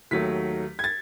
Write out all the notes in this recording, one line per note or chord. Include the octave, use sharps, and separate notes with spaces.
D#2 D#3 F#3 A3 B6
G#6
A6